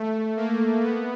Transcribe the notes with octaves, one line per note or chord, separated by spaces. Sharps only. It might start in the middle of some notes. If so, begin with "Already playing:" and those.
Already playing: A3
A#3
B3